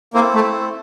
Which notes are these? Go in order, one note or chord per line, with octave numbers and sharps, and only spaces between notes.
A#3 C4 E4 A4 C5
A3